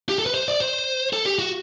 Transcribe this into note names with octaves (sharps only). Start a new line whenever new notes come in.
G4
A4
B4
C5
D5
C5
A4
G4
F#4